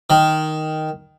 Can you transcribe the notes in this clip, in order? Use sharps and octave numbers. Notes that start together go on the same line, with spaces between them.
D#3